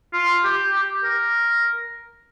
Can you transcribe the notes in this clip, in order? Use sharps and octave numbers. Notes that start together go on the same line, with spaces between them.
F4
G4
G4
A#4